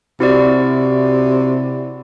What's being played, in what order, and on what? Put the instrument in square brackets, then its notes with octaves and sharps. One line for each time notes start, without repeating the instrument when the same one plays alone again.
[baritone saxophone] C3 [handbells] E4 F#4 D5